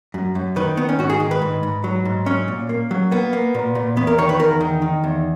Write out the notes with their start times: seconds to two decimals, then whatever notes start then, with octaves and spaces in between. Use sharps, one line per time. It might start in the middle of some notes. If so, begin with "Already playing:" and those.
0.14 F#2
0.35 F#2
0.56 D#3 B4
0.77 D#3 B3
0.89 C#4
0.99 G#2 F#4
1.10 G#4
1.20 D#3
1.31 B4
1.42 G#2
1.63 G#2
1.84 F#3
2.05 G#2
2.26 F#3 C#4
2.48 A#2
2.69 A#3
2.91 F#3
3.11 A#3 B3
3.33 A#3
3.54 A#2
3.75 A#2
3.97 E2 B3
4.07 A#4
4.18 D#3 C#5
4.29 B4
4.40 E2 A#4
4.61 D#3
4.82 D#3
5.04 E2